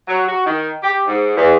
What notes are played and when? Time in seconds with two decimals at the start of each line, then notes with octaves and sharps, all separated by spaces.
0.07 F#3
0.27 F#4
0.45 D#3
0.83 G4
1.06 G#2
1.36 E2